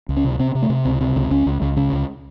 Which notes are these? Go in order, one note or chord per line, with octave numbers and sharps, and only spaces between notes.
C#2
C#4
C3
C3 C4
C3
A3
C3
C#2 C4
C3
C#2
C#2 C#4
C#2
C#2
C#3 C#4
C#2